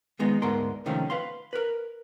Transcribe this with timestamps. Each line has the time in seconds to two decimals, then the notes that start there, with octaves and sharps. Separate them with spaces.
0.19 D#3 G#3 B3 D#4
0.42 D2 G#2 B3 A#4 C6
0.86 C3 D#3 F3 A3 C#4
1.10 B4 F5 C6
1.53 A#4 B4